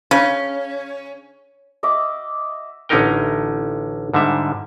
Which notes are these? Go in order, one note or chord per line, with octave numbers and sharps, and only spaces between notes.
C#3 C#4
D#5 E5 F#5 D6
A1 D3 C#4 D#4 A#4 G5
G#2 D3 G3 E5